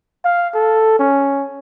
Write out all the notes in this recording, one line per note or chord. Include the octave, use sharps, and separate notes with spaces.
F5
A4
C#4